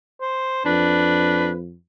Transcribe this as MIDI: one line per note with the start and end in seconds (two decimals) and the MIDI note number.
0.21 0.62 72
0.65 1.74 41
0.65 1.49 62
0.65 1.53 71